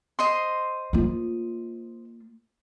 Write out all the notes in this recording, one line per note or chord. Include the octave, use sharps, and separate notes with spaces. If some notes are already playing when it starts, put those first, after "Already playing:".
C5 D#5 C6
A#3 F4